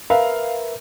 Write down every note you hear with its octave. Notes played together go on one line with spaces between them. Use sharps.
A#4 B4 E5 F5